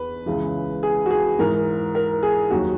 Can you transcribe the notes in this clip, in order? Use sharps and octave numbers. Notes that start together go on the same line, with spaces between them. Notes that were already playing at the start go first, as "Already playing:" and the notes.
Already playing: E2 B4
C#2 C#3 E3
G#4
F#4
G#4
G#2 E3 A#4
A#4
G#4
D#2 D#3 F#3 F#4